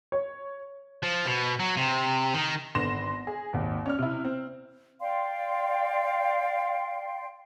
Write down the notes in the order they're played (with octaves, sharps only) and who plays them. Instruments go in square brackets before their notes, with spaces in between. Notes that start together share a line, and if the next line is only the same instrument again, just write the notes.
[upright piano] C#5
[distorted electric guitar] F3
B2
F#3
C3
D#3
[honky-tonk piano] G#1 D3 B3 C6 A#6 E7
G#4
G#1 D#2
C#4 D5 F6
C3 E4
C4
[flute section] D5 F5 G5 C6